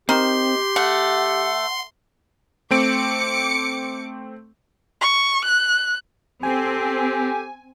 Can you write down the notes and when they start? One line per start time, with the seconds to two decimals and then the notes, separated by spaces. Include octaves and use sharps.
0.09 D#3 C4 G4 C6
0.76 A3 F#5
2.71 A3 C4 D6 C#7 D7
5.01 C#6
5.45 F#6
6.43 C4 G4 A4 G#5